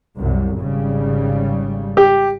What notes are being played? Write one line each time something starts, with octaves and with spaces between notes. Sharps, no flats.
C2 F#2
G#1 C#3 G3
G4